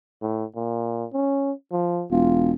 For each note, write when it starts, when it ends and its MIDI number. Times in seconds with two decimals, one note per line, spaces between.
0.22 0.45 45
0.55 1.05 46
1.13 1.51 61
1.71 2.05 53
2.11 2.54 28
2.11 2.52 65